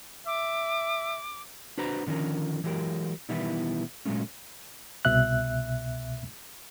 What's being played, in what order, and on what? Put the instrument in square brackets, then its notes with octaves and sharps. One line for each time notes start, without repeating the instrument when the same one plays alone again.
[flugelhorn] E5 [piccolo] D6
[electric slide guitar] D4 F#4 B4 C5 A#5
D3 D#3 F3 C#4 A#4
E3 F#3 G#3 G4 A#4
B2 D#3 E3 G3 B3 E4
A#2 F#3 G#3 A3 C#4
[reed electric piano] C2 B2 E5 F#6